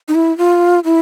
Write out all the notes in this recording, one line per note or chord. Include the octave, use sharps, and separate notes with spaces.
D#4
E4
F4
E4